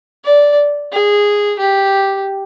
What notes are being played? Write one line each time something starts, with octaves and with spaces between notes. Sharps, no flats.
D5
G#4
G4